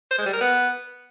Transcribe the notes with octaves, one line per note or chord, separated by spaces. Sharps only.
C5
G#3
G3
A#4
B3